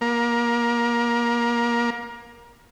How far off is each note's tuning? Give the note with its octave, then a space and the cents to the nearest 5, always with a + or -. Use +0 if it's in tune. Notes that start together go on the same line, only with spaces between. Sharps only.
A#3 +25